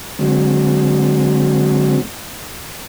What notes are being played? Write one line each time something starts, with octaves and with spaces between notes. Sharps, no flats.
D3 F#3 G#3 C4